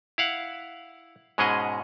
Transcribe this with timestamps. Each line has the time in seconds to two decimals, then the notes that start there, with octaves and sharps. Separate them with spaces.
0.18 E4 F5 F#5
1.38 G#2 B2 G#3 C#4 G#4 D#5